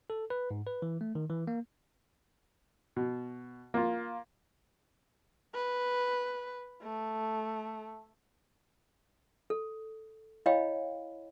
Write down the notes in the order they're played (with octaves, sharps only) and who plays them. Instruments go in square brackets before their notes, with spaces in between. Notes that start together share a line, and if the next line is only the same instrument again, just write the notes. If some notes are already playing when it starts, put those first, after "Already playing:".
[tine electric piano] A4
B4
G#2
B4
E3
A3
D#3
E3
A#3
[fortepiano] B2
A#3 F4
[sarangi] B4
A3
[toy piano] A4
E4 C#5 D#5 F5 G5 B5